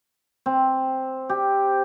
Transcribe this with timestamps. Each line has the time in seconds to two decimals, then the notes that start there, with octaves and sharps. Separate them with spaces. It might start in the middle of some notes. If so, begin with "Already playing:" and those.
0.46 C4
1.29 G4